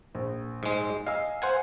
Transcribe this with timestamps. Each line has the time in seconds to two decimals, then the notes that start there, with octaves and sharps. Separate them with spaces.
0.15 A#1
0.63 G#2 G#3
1.07 D#5 F5 G#5 E6
1.42 C5 F5 F#5 G#5 C6